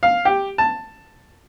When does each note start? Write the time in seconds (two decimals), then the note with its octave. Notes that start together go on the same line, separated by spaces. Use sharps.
0.03 F5
0.25 G4
0.58 A5